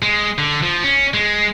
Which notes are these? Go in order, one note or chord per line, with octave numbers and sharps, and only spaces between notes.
G#3
D3
F3
C#4
G#3